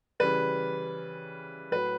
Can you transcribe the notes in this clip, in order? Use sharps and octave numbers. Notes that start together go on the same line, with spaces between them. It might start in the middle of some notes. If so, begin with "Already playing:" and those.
C#3 E3 G3 B4
A2 F#3 B4